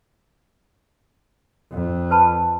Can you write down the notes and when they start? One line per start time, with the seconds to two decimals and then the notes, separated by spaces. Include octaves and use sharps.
1.71 F2
2.11 B4 A5 B5